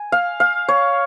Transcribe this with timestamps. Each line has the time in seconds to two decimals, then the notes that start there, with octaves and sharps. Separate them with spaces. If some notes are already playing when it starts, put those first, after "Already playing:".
Already playing: G#5
0.12 F5
0.40 F5
0.68 C#5